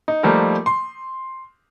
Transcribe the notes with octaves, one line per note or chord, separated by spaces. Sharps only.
D#4
F3 G3 A3 A#3 D#4 A#4
C6